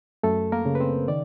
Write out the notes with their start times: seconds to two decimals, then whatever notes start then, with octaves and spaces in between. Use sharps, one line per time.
0.23 F#2 A3 A4
0.52 A#3 A#4
0.66 C#3
0.75 B4
0.80 C4 C5
1.08 D#3 D5